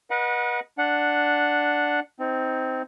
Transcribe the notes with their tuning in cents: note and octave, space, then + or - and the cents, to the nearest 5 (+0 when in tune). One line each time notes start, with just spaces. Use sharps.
B4 -35 D#5 +0 F#5 -20
D4 +0 F#5 -5
C4 -10 D#4 +20